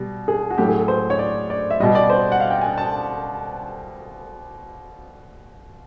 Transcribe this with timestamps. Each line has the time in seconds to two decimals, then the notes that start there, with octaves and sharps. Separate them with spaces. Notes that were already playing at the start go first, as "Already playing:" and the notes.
Already playing: B2 G3
0.28 G#4
0.50 F#4
0.58 A2 F#3 G4
0.68 G#4
0.79 A4
0.88 C5
1.10 C#5
1.19 D5
1.50 D5
1.70 E5
1.80 B2 G3 D#5
1.95 D5
2.10 C5
2.32 F#5
2.40 F5
2.50 G5
2.61 G#5
2.78 A5